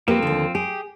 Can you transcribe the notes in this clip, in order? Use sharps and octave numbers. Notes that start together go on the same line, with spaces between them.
F3 A#3 C4 G4 B4
D#2 D3
G4 G#4